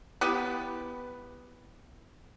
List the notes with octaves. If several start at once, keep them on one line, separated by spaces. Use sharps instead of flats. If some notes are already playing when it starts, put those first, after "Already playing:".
B3 E4 G4 B4